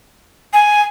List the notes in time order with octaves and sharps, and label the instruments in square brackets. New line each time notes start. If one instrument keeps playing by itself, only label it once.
[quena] G#5